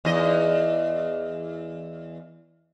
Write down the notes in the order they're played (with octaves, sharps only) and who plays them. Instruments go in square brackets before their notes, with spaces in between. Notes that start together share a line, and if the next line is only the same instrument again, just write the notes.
[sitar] E2 D#5